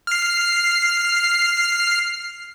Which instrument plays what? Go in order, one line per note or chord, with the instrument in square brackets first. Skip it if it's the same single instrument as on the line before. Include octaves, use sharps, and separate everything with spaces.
[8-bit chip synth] F6 C7